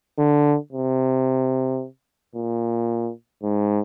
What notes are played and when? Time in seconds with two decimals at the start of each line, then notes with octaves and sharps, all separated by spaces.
0.19 D3
0.73 C3
2.35 A#2
3.43 G#2